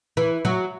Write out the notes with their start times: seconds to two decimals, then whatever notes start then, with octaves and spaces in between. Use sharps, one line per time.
0.17 E3
0.45 F#3